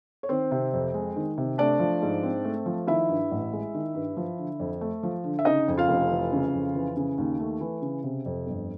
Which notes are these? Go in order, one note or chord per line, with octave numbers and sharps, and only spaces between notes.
C#5
D#3 C4 C5
C3
F2
G#3
D#3
C3
A3 D4 D5
F3
G#2
C4
A3
F3
D#3 E4 E5
G2
A1
G#3
D#3
G2
F3
D3
F2
A3
F3
D3
E5
C#3 D#4 D#5
F2
F4 F5
F1
E3
C#3
F2
E3
C#3
D#2
A3
E3
C#3
C3
F2
G1